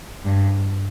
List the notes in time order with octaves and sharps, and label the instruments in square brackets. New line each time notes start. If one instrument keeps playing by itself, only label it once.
[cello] G2